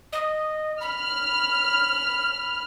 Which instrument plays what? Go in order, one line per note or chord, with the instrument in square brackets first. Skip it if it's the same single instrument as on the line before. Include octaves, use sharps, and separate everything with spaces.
[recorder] D#5
[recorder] B5 [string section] F6